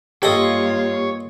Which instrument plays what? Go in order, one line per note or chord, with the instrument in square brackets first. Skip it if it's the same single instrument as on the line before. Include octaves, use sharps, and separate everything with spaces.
[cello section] G2 A#3 F4 [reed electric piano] G4 [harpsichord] A4 D#5 [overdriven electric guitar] C#5